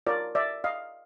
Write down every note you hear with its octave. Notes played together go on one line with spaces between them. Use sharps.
F4 A#4 C#5 D5
D5 E5
D#5 F5